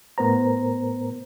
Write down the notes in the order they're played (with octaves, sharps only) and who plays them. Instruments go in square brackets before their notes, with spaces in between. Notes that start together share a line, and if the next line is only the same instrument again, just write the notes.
[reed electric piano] A2 B3 A#4 C5 A#5